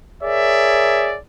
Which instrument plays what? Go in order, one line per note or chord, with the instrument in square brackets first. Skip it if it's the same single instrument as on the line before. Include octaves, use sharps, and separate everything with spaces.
[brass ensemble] G#4 A#4 C#5 D5 E5